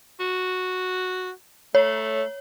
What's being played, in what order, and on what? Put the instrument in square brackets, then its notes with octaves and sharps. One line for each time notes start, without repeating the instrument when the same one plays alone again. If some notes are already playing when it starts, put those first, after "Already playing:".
[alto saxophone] F#4
[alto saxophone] A3 [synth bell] C#5